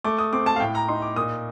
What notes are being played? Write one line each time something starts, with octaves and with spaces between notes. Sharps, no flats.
A3 D6
D#6
C4 D6
A5
F5
A2 G5
A#5
D#4 C6
D6
A#2 D#6